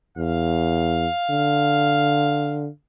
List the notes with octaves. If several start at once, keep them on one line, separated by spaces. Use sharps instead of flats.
E2 F5
D3